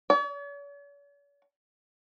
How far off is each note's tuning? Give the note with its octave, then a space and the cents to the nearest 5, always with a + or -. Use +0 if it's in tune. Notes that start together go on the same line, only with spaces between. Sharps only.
C#5 +45